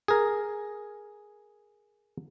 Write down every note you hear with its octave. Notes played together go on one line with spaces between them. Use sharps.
G#4 A#4